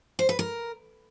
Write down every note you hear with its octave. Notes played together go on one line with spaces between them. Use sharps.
C5
B4
A#4